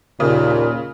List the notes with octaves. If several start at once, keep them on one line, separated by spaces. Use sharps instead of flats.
D#2 A#2 C#3